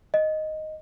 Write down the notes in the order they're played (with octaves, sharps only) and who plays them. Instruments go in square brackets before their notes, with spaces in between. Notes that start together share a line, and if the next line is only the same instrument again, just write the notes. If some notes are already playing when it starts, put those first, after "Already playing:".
[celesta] D#5